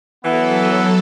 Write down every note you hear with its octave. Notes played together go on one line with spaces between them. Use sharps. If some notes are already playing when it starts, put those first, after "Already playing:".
E3 F#3 B3 A4